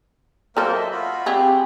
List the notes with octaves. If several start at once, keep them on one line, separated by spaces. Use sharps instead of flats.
F#3 A#3 A4 A#4 C5
D#5 E5
F4 F#4 B5
C4 G4 G#4